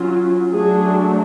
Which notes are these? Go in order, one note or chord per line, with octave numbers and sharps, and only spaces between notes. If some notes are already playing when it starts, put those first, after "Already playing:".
Already playing: F#3 C#4 F4
F#3 A3 D4 G#4